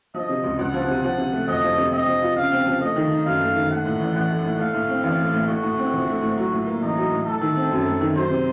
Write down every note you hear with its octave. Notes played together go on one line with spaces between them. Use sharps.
F3 D#5
C3
C#2
C#2 F#5
F3
C3
F3 F#5
C3
A3
F2 D#5
F3
C3
C4 D#5
F3
F4
C#3 F5
C4
F3
A3 D#5
D#3
D#4
F#2 F5
A3
D#3
A3 F#5
A2
A1
A1 F#5
A3
A2
A3 F5
A2
C4
A1 F5
A3
A2
A3 F#4
A2
C4
A#1
A3
A2
F#3
A2
A#3
A1 D#4
F#3
A2
A3 A4
D#3
C4
F#2
A3
D#3
F#3 C5
C3